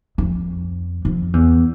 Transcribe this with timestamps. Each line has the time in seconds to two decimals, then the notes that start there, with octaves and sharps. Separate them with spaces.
0.18 F2
1.05 F2
1.33 E2